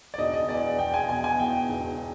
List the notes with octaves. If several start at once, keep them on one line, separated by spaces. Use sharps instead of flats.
D5
E1 D#5
D#5
E2 D5
E2 G5
G#5
B2 G#5
G#5
E2 G5
E1